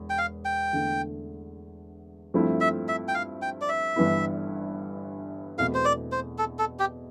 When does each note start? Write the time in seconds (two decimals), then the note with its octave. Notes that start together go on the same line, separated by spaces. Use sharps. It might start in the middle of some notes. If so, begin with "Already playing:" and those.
Already playing: E1 E2
0.10 G5
0.18 F5
0.45 G5
0.72 E2 D3 A3
2.34 G2 F3 A3 C4 E4
2.60 E5
2.88 E5
3.08 G5
3.14 F5
3.42 G5
3.61 D5
3.68 E5
3.96 G1 G2 E3 B3 E4
5.58 E2 B2 A3 C4 E4 F5
5.74 C5
5.85 D5
6.12 C5
6.38 A4
6.59 A4
6.79 G4